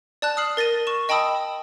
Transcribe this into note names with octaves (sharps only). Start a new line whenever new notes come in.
D5 A5 F#6
D#6 F6 C7 F#7
A#4 A6 A#6 D#7 G7
C#6 E7
D#5 G5 A5 B5 D#6 E6